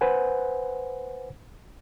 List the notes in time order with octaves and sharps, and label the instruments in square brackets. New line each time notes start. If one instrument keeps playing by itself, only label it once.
[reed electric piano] B4 C5 F#5 G#5